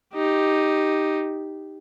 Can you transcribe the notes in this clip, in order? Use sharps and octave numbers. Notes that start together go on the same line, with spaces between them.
D#4 G4